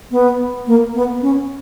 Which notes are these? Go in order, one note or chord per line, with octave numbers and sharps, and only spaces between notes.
B3
A#3
B3
C#4